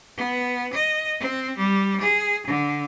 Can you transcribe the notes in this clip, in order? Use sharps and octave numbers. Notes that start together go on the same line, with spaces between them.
B3
D#5
C4
G3
G#4
D3